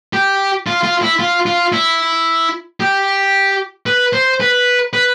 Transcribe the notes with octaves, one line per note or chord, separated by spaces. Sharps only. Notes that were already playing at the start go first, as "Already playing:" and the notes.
G4
F4
F4
E4
F4
F4
E4
G4
B4
C5
B4
B4